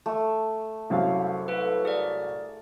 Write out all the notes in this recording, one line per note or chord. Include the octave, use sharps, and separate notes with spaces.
A3
C2 F#2 F5
A4 B4
G#4 A#4 D5